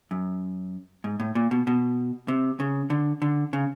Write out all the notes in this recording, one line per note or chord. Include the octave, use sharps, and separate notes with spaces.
F#2
G#2
A2
A#2
B2
B2
C3
C#3
D3
D3
C#3